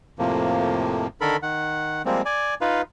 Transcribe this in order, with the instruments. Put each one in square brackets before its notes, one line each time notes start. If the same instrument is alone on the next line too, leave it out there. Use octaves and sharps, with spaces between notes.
[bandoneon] F2 A2 C3 F3 A#3
D3 D#3 A4 A#4 B5
D#3 F#5
F3 G3 G#3 A#3 C4
D5 G#5
D#4 F4 B4 F5